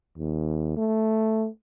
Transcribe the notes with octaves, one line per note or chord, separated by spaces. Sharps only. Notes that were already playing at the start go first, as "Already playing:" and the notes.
D#2
A3